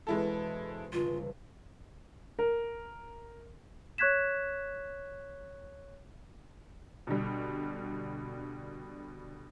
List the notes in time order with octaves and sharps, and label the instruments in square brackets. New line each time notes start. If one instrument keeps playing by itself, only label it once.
[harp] E1 C#7 [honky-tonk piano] G#3 E4 A4
[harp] C5
[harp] G1 C#2 [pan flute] F4
[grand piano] A#4
[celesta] C#5 C#6 F#6 G#6 B6 E7
[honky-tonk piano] B2 D3 G3